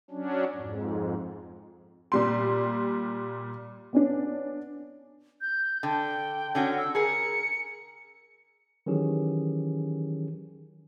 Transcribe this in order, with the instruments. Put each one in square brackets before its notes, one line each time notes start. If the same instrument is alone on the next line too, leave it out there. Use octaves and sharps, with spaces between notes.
[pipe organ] F#3 C#4 D4
F2 G#2
[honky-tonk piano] A#2 G3 C6
B3 C#4 D4
[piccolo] G6
[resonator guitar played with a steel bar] D3 [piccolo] G5
[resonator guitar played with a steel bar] D3 C#4 F#4
[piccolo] E6
[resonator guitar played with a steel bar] G#4 A#4 [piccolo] C#7
[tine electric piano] D#3 E3 F#3 C#4 G4 G#4